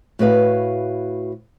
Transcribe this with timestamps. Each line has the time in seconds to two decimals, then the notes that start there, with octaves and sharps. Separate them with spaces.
0.19 A2 F#4 B4 F5